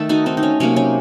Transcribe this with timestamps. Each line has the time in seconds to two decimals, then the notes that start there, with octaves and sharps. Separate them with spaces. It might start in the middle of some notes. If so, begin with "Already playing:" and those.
Already playing: D#3 A3 A4
0.09 D#4 F#4
0.26 C4 D#4
0.37 D#4
0.43 C#4
0.60 C3 F#3 A#3 C#4
0.76 C#4